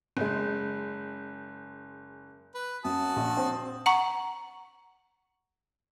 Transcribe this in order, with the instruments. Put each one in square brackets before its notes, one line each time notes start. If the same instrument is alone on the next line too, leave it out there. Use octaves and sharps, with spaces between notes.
[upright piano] F#1 G#3
[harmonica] B4
[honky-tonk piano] F#2 [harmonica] F#4 A5 D#6
[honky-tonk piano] A#1
C4
[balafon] F#5 A#5 C#6